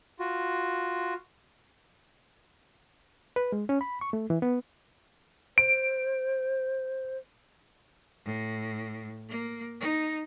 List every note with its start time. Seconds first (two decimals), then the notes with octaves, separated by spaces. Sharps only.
0.19 F4 F#4
3.36 B4
3.52 G#3
3.69 C#4
3.81 B5
4.01 C#6
4.13 A3
4.30 E3
4.42 B3
5.58 C5 D7
8.25 A2
9.29 A#3
9.81 D#4